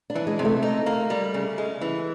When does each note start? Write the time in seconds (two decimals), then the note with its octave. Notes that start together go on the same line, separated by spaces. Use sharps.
0.10 D4
0.15 E3
0.27 G#3
0.39 C3
0.45 A3
0.63 D#4
0.86 A#3
1.10 G3
1.34 C#3
1.58 G#3
1.81 E3